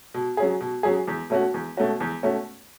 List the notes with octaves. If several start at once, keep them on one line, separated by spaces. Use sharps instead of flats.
B2
F#3 C#4 G#4
B2
F#3 C#4 G#4
E2
B2 A3 C#4 F#4
E2
B2 A3 C#4 F#4
E2
B2 A3 C#4 F#4